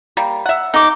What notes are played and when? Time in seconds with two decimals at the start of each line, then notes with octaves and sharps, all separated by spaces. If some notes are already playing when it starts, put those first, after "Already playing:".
0.17 G3 A#3
0.46 E5 F#5
0.74 D#4 D6